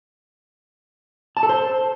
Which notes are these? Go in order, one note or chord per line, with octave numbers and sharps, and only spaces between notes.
A5
A4
C5